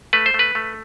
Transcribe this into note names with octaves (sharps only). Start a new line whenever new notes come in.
A3 B4
C5
A3
B4
A3